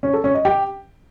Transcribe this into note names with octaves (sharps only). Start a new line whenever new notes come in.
C#4
A4
C#4
D#5
G4